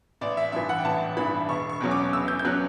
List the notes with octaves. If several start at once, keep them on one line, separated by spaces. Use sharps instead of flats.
A1 D5
E5
G2 E3 E5
F#5
G5
A1 A5
G2 E3 B5
E1 C#6
C#6
E2 B2 F#3 C#4
D6
E1 E6
G6
G6
B2 F#3 C#4 F#6